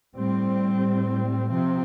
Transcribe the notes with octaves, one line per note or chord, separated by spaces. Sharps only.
A2 G3 C4
C3 F3 C4